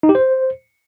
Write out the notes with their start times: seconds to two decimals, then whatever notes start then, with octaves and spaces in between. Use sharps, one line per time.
0.03 D#4
0.09 G4
0.15 C5